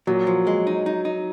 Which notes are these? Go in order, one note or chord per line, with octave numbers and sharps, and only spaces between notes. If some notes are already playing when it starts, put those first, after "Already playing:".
A#2 F#3
F3
G#3
D#4
D#4
D#4